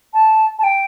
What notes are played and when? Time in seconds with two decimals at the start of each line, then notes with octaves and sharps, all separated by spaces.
0.14 A5
0.59 A5
0.64 G5